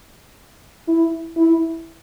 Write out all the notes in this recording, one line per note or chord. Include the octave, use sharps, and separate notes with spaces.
E4
E4